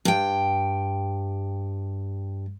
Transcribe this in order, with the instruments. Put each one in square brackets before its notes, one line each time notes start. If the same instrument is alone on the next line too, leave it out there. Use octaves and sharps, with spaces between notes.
[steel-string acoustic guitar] G2 G5